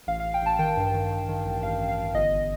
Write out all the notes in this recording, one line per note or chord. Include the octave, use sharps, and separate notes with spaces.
A1 F5
A1 F5
G5
A1 A5
D#3 G5
G2
D#3
D#3
D#3
A1
A1 F5
A1
F5
A1
G1 D#5
G1